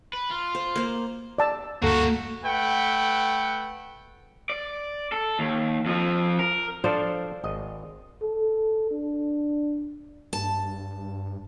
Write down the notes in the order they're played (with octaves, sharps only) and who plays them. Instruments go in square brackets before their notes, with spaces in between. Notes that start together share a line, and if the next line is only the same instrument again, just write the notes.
[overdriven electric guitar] B4
F4
[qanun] C5
A#3 C5
[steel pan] D5 A5 E6
[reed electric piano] D2 G2 A4 [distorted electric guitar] A#3 E5 [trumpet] F#4
[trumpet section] A3 B4 F#5 G5
[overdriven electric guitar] D5
A4
D#2
F2 F3
A#4
[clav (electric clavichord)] F3 D4 A4 [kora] C5 D5 F5
[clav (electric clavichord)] G#1 D#5
[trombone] A4
D4
[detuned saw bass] G2 [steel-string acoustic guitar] A5